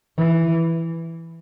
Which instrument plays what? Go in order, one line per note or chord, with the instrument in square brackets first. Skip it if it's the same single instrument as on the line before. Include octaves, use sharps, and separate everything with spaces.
[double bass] E3